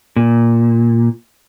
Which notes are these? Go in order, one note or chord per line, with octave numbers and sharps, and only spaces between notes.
A#2